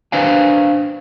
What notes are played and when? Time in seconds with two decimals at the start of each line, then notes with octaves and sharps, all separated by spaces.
0.12 D4 B4 C5 F5 G5 G#5